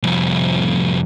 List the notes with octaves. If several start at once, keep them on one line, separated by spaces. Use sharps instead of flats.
C2 F2